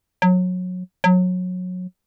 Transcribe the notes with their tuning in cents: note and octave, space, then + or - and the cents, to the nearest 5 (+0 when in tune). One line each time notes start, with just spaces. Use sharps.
F#3 -25
F#3 -25